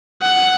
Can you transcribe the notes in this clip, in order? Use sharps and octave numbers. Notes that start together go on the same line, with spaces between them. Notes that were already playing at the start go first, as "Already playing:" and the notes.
F#5